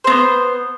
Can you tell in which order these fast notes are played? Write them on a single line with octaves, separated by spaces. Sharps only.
C5 C4 B3